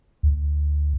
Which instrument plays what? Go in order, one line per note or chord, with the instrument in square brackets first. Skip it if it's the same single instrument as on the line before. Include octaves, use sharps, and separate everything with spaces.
[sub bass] D2